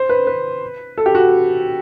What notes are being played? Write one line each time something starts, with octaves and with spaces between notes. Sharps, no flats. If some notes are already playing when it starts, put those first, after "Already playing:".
Already playing: C5
B4
B4
A4
G4
F#4